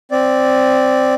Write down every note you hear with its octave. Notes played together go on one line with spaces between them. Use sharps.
C4 D5